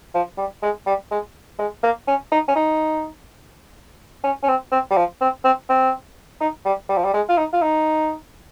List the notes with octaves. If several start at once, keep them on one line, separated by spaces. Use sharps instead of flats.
F3
G3
G#3
G3
G#3
G#3
A#3
C#4
D#4
C#4
D#4
C#4
C#4
C4
C4
G3
F3
C4
C4
C4
D#4
G3
G3
F3
G3
G#3
F4
D#4
F4
D#4